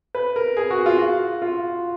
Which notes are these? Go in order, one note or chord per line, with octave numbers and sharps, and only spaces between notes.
B4
A#4
G#4
F#4
F4
F#4
F4